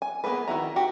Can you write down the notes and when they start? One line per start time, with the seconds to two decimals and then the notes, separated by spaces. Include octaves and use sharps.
0.02 G#5
0.24 A#3 B3 C#4 G#4 B4
0.48 D#3 E4 F#4 A#5
0.76 F#4 G4